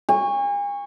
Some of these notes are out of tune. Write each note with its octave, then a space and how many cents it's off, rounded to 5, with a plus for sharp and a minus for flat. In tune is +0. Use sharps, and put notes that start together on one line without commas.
G#5 -40 C#6 +0